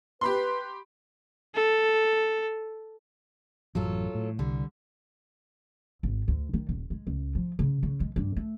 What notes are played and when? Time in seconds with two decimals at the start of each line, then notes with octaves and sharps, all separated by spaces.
0.21 G4 B4 B5 C6
1.55 A4
3.75 A1 F#2 F#3 F4 A4
4.15 A2
4.39 C2 D3 G3
6.03 G#1
6.28 D2
6.53 D#3
6.69 D#1
6.90 G#3
7.07 C#2
7.35 F3
7.59 C#3
7.83 C#3
8.00 G#3
8.16 G2
8.36 A3